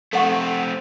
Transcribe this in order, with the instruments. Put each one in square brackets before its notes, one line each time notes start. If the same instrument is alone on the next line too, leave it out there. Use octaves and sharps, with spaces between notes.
[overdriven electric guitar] A3 C4 [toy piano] A4 F#5 C#6